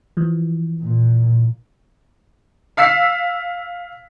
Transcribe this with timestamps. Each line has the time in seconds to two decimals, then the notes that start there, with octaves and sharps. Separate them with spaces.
0.17 E3 F3
0.82 A#2
2.77 F5 E6 B6 C7